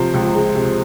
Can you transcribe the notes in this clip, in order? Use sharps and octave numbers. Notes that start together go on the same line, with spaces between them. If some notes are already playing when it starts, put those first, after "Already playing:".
Already playing: C3 F3 C5
C#2
G#3
C3